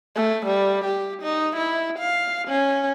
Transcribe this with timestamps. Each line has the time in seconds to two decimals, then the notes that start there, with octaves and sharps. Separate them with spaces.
0.16 A3
0.46 G3
0.85 G4
1.22 D#4
1.56 E4
1.99 F5
2.48 C#4